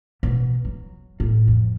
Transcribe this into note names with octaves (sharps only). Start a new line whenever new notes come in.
B2
F#3
A2
F2